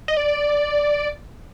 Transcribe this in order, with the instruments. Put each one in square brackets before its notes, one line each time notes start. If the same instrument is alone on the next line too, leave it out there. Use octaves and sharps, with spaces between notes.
[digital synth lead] D#5
D5